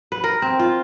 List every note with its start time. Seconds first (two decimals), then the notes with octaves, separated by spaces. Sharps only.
0.12 B4
0.24 A#4
0.42 C4
0.59 F4